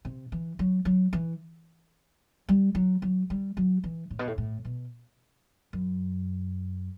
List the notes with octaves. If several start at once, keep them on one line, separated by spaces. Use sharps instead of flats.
C3
E3
F#3
F#3
E3
G3
F#3
F#3
G3
F#3
E3
A2
B2
A2
A2
B2
F#2